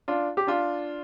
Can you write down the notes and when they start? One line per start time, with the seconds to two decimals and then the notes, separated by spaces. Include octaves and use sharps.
0.08 D4 F4
0.37 G4
0.47 D4 F4